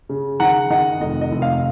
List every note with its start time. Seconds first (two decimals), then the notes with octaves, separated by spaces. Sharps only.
0.09 C#3
0.40 D#3 F#5 A#5
0.70 D#3 D#5 F#5
1.01 F1 D#5
1.21 D#5
1.31 F1
1.42 F5